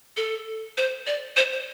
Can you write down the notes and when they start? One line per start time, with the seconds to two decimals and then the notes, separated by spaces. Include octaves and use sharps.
0.17 A4
0.77 C5
1.07 D5
1.36 C5
1.52 C5